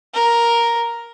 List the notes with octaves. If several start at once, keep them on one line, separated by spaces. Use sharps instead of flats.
A#4